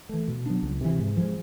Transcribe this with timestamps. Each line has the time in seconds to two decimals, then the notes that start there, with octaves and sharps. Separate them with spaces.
0.09 E3 A3
0.28 B2
0.46 F#3 B3 D4
0.63 C#2
0.81 C3 E3
0.99 G#2
1.17 F3 G#3